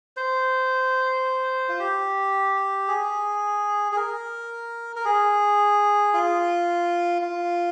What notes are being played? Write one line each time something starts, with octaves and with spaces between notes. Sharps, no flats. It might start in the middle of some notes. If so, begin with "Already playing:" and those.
C5
F4
G4
G#4
G#4
A#4
A#4
G#4
F4
F4